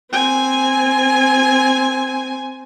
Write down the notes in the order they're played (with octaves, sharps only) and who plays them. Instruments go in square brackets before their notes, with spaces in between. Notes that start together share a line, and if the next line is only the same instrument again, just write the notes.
[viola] C4 G#5